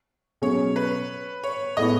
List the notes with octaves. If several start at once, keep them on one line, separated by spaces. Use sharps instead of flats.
B2 F#3 C#4 G#4 C#5
B4
C#5
A2 G#3 B3 E4 D#5